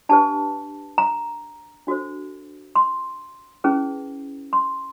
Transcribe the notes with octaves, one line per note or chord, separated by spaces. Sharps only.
D4 G4 B4 A5
A#5
D4 F#4 A4 C5
C6
C#4 E4 G#4 B4
C6